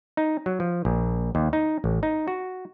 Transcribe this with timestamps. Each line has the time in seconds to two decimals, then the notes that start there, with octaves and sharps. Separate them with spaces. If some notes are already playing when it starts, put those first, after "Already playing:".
0.17 D#4
0.46 F#3
0.60 F3
0.85 A#1
1.35 D#2
1.53 D#4
1.84 A1
2.03 D#4
2.28 F#4